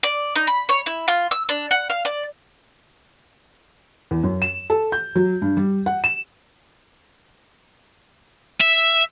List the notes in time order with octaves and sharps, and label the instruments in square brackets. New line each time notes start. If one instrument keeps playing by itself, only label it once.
[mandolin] D5
D#4
B5
C#5
E4
F4
E6
D4
F#5
F5
D5
[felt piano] E2
F#2
E7
A4
G6
F#3
G2
G3
F#5
E7
[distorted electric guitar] E5